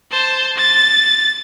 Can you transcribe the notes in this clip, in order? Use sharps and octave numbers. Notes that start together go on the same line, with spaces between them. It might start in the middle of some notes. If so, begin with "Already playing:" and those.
C5 A5
A6